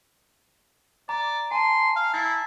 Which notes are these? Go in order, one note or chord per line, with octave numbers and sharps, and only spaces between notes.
D5 A#5
G#5 A5 C6
F5
E4 A6 C7